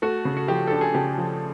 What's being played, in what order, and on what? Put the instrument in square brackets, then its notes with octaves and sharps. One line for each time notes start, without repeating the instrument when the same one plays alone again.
[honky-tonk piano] A3 [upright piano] F#4
[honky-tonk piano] C#3
[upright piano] F#4
[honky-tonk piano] F3 [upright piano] G4
[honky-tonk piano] D4 [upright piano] A4
[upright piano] G#4
[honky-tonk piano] C#3 [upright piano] G4
[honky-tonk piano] F3